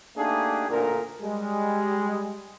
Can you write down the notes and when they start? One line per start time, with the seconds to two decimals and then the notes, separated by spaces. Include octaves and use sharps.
0.17 A3 A#3 D4 D#4 G4 G#4
0.69 A1 D2 A#2 D3 A#4
1.21 G3 G#3